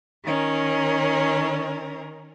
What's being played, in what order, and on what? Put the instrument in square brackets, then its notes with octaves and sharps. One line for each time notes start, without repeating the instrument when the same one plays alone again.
[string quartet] D#3 C#4 A#4